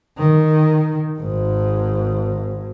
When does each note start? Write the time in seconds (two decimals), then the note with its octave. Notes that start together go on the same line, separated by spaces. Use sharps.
0.17 D#3
1.19 G#1 G#2